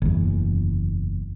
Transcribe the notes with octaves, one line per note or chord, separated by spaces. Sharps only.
F#1 E2